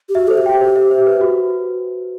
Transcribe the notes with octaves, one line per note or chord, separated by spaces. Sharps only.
G4
F#4 E5
A4 C5
G4
G5
C5
E5
C5
B4
F#4